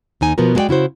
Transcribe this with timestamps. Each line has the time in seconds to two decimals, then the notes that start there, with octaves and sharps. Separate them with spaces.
0.21 D#2 D#4 G#5
0.38 B2 F3 B3 F#4 A#4
0.55 G#3 F#4 A#4 D5 G5
0.69 C#3 E4 F#4 C5